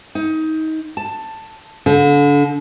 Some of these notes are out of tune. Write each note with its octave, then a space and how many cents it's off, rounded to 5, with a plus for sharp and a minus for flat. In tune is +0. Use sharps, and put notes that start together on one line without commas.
D#4 +25
A5 +10
D3 -30